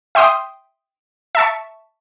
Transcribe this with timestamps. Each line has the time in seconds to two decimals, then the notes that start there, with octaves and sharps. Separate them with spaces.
0.15 E5 G5 C6 D#6
1.35 E5 A5 C#6